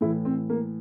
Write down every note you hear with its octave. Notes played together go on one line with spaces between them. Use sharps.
A2 E3 E4
C4
A#3